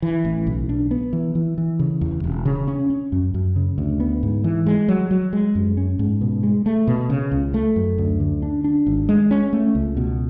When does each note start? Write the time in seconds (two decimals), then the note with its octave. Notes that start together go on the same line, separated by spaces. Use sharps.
0.02 E3
0.25 A1
0.47 B1
0.69 D4
0.91 B3
1.13 E3
1.35 E3
1.58 E3
1.79 C#3
2.01 E2
2.24 E1
2.45 C#3
2.68 C#4
2.90 C#4
3.12 F#2
3.34 F#2
3.56 C#3
3.78 D2
4.00 B3
4.23 G#2
4.44 E3
4.66 G#3
4.88 F#3
5.11 F#3
5.33 G#3
5.55 F#2
5.77 C#4
5.99 G#2
6.21 B2
6.43 G#3
6.66 A3
6.87 B2
7.10 C#3
7.31 C#2
7.54 A3
7.76 F#2
7.98 D2
8.20 D3
8.42 D4
8.64 D4
8.86 G#1
9.09 G#3
9.31 C#4
9.53 A3
9.75 C#2
9.97 B2